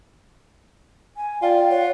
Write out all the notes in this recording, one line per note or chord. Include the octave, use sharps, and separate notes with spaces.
G#5
F4 D5 G5
C#5 F#5